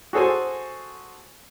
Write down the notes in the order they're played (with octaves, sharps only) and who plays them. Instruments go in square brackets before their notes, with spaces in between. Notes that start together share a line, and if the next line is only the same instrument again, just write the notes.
[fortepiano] F#4 G#4 A4 C5 G#5